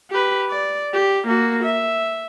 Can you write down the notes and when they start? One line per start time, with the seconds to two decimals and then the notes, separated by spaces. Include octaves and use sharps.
0.11 G4 B4
0.50 D5
0.93 G4
1.27 A#3 F#4
1.63 E5